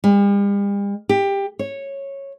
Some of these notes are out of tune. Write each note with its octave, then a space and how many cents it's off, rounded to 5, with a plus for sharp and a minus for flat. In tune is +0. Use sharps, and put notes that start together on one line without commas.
G3 +45
G4 +15
C#5 -10